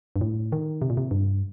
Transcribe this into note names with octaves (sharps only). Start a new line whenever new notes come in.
G2
A2
D#3
C3
A#2
C3
G2